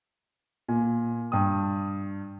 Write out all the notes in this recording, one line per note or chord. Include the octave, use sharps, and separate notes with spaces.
A#2 G#5
G2 G5 D#6